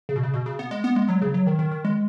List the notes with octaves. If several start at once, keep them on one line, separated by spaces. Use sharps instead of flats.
C#3
B2
C#3
B2
C#3
B3
G#3
B3
G#3
F#3
C#3
F#3
D#3
D#3
D#3
G#3